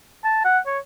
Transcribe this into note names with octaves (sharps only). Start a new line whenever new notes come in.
A5
F#5
C#5